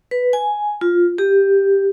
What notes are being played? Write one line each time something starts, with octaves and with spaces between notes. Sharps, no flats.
B4
G#5
F4
G4